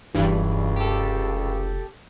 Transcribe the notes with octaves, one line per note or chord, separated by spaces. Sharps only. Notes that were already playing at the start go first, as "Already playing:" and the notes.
F1 C#2 G2 E3
G4 A4